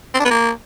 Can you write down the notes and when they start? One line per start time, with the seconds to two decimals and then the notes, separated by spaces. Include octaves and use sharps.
0.14 C4
0.20 D4
0.25 B3
0.31 A#3